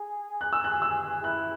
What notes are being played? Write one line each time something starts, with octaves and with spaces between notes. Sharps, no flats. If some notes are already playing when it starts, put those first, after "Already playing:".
Already playing: G#4
F#6
E6
F#6
E6
E4 F#6